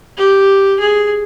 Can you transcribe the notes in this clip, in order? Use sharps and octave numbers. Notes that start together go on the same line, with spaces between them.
G4
G#4